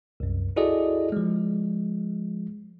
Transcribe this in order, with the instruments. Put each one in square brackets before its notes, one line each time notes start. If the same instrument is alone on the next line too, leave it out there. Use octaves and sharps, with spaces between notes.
[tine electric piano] C2 F#2
E4 F#4 G#4 A4 D5 D#5
F3 G#3